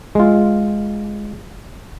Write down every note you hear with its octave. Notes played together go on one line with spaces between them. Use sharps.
G#3 F4